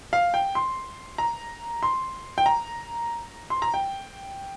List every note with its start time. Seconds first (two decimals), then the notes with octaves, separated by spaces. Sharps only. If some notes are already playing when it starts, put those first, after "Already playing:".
0.13 F5
0.34 G5
0.55 C6
1.18 A#5
1.83 C6
2.38 G5
2.46 A#5
3.50 C6
3.62 A#5
3.74 G5